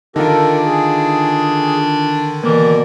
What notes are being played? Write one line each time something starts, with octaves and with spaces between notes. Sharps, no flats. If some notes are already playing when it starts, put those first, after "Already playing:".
D3 D#3 D4 D#4 F4 G4 A4 A#4
G#4
B2 E3 A#3 A#4 D5